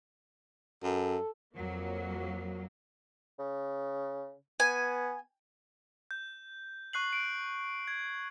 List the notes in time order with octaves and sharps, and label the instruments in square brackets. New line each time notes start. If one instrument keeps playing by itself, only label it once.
[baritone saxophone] F#2 [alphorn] A4
[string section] F2 F#3 A#3
[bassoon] C#3
[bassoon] B3 [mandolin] G#5
[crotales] G6
C#6 F#6 C7 F#7
D7
G#6